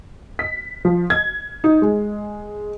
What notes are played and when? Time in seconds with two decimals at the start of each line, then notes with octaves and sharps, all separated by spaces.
0.39 B6
0.85 F3
1.10 G#6
1.64 D#4
1.82 G#3